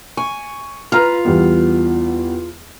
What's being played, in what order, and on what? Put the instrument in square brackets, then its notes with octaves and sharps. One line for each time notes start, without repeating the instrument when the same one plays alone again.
[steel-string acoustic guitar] G#5 [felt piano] C#6
[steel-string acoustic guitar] F4 [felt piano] B4 A#5 F6
[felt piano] E2 G3 B3